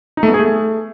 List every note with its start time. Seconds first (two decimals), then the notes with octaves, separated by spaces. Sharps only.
0.17 D#4
0.23 A3
0.28 B3
0.34 G#4
0.39 A3